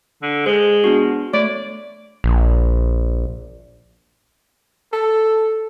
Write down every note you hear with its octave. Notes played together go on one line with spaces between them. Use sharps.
D3
G#3 C5
B3 D4 F#4
A3 C#5 D5
A#1
A4